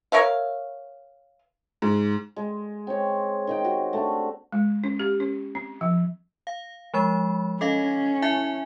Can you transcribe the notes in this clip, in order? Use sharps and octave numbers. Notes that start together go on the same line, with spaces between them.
A#4 C#5 E5 F5
G#2
G#3
C4 C#5
D#3 D#5 G5
F#4 G4
A3 D4
G#3
C#4
G4
C#4
C4
F3
F5
F3 G#3 B5
C#4 A4 D#5 F5
E4 E5 G#5